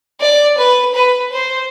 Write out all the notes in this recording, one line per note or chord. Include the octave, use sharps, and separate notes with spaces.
D5
B4
B4
C5